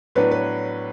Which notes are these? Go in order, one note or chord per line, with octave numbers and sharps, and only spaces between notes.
A2 F#3 B3 D4 B4
B4